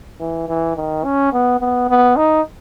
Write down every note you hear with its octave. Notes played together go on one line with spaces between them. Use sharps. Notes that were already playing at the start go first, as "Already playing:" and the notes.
E3
E3
D#3
C#4
B3
B3
B3
D#4